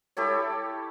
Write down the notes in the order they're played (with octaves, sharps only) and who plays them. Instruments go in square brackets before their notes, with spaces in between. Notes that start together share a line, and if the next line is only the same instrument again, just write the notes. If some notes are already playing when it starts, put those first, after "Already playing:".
[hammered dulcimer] E4 G4 A4 C#5